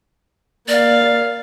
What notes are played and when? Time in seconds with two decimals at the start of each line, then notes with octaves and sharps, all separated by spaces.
0.68 A#3 D5 F5